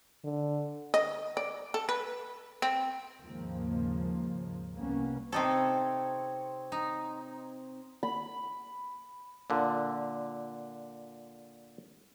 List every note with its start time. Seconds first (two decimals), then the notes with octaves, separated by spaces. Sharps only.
0.24 D3
0.94 D#5
1.37 D5
1.74 A4
1.89 B4
2.62 C4
3.19 D#2 G#2 C#3 F3 G#3 A#3
4.72 C2 G3 A#3 B3 C#4
5.32 C3 C4 D#4 A4 C#5
6.72 D#4
8.03 B5
9.50 A#2 D3